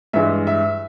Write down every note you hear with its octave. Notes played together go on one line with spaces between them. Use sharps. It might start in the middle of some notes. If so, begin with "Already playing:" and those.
G2 E3 G#3 E5
E5